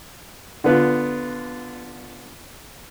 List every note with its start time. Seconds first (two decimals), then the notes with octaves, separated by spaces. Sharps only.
0.64 D3 B3 F4